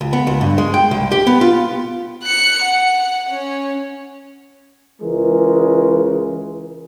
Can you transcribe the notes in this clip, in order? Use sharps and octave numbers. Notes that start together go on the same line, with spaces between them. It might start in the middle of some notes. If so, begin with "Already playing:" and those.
C#2
B3
C#2
G2
G#3
G5
C2
G4
B3
F4
F#6 C#7
F#5
C#4
C#2 E3 G#3 A#4